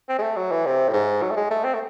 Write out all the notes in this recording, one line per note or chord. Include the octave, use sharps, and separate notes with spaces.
C4
G#3
A3
F#3
E3
C3
A2
G#2
F#3
A3
G#3
A3
C4
A3